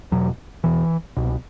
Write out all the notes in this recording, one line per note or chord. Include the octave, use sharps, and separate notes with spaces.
E2 B2 F#3
E2 B2 E3
C2 B2